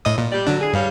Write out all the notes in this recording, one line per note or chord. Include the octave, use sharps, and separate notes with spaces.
A2 D#5 D#6
A#2
G3 G4 D5
D3 F#3 D4
A2 G#4
G2 G3 C#5 F5